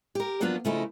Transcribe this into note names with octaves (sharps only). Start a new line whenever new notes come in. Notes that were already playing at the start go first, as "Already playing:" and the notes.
G4 A#4
F3 F#3 A#3 B3 D4 F4
C#3 F3 A3 C#4 D#4 E4